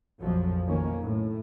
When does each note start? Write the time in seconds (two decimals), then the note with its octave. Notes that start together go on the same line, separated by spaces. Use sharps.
0.20 A#1 F2 F3 F#3
0.66 B1 F2 D#3 A#3 C#4
1.01 A2